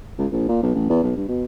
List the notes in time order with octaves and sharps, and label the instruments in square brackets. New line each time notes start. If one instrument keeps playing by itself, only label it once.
[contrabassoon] C#2
A#1
A#2
B1
A1
E2
B1
G2
B2